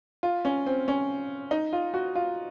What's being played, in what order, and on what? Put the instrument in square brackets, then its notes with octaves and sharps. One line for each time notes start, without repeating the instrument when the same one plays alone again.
[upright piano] F4
C#4
C4
C#4
D#4
F4
F#4
F4